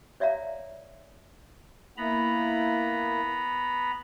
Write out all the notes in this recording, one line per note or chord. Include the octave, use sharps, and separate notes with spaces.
C#5 D5 E5 F5 A#5
A#3 B3 E4 A#5 B5